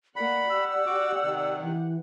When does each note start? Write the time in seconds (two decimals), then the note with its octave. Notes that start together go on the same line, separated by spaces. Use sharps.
0.16 A#3 D5 F#5 B5
0.50 G4 F#5 E6
0.86 F#4 D6
1.24 C3 D#3
1.62 E3